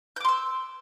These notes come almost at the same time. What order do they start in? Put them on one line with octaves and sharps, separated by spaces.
G6 D6 C6 E6